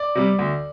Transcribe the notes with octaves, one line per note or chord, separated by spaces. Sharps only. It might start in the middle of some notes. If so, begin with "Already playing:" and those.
Already playing: D5
C3 G3
D2